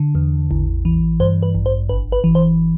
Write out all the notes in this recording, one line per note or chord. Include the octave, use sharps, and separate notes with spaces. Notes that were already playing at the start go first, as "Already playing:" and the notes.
Already playing: D3
E2
A1
E3
G2 C5
B4
A1
C5
G1 B4
B4
E3
C5